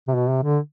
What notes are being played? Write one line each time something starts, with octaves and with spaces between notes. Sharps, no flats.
C3
B2
C3
D3